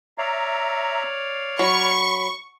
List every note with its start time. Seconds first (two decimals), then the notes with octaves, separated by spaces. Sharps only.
0.18 C#5 D5 E5 F5 A#5
1.59 F#3 B5 C#6